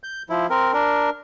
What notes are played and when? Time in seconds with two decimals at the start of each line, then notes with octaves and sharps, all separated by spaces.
0.04 G6
0.30 F3 E4
0.50 C4 A#4
0.73 D4 A#4